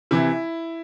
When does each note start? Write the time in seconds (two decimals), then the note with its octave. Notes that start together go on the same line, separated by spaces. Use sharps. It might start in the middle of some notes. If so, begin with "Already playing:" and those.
0.11 C3 E3 E4